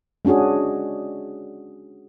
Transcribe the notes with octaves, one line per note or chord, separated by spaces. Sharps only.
G#3 C#4 D4 F#4 G#4